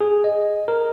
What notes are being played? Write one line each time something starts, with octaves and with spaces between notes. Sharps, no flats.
G#4
D#5
A#4